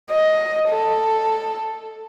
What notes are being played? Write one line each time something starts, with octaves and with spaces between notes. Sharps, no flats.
D#5
A4